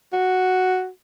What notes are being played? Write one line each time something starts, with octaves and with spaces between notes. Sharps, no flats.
F#4